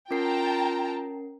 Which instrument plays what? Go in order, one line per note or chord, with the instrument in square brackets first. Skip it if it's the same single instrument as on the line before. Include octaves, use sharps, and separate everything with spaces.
[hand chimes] C#4 A#4 C7 [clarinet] F4 [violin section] G5 A5 A#5